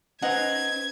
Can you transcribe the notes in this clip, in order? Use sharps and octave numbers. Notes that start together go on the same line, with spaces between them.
C#4 D#4 B4 C5 F#5 A#5 G#6